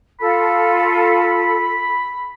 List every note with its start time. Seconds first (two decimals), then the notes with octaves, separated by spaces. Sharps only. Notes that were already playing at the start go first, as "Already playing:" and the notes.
0.20 F4 A4 B5